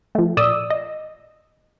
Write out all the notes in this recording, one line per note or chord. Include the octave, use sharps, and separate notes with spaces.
F3 A3
A#2 D5 D#6 E6
D#5